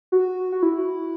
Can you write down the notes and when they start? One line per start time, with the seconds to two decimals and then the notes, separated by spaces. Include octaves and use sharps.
0.12 F#4
0.52 F#4
0.63 E4